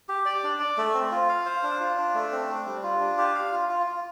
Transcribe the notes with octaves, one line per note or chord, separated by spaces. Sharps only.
G4
D5
D4
D5
A3
C4
F4
F5
C5
D4
F4
D4
A3
C4
D4
G3
F4
D4
G4
F5
F4
F4
F4